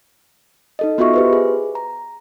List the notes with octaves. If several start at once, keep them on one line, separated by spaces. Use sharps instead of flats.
D#4 A4 D#5
B3 F4 F#4 D#5 E5 C#6
G4 B4 C5
G#4
A#5